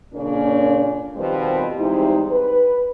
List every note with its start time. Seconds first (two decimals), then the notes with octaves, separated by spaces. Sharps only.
0.14 F2 A#2 C#3 A#3 C#4 D4
1.17 B2 D#3 F3 G3 B3 C4
1.78 E2 G#2 G3 C4 D#4 E4
2.29 B4